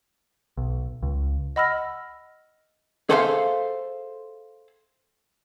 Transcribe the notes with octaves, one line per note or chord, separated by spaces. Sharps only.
B1
C#2
D#5 F#5 B5 E6 F6 A#6
G#4 A4 C5 E5 F5